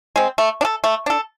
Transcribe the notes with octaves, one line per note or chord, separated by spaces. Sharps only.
G#3 C4
A3
D4
A4
A3
D4 A4